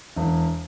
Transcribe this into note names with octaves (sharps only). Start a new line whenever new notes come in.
E1